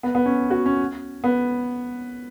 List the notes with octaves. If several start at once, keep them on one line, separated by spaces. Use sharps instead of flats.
B3
B3
C#4
F#4
C#4
B3